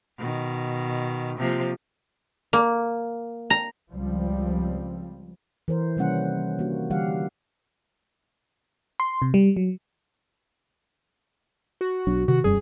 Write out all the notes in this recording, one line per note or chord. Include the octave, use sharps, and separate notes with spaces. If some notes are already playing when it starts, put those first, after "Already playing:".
B2 D#3
C3 F3 A#3
A#3
A#5
C#2 F3 G3 C4
E3 A#4 C5
C3 D#3 G3 A#3 C#4 F#5
A#3 D4 F#4
D3 E3 G3 G4 F5 F#5
C6
C3
G3
F#3
F#4
B1 F#3 D4
C3 D#3 F#4
E1 F#2 G3 G#4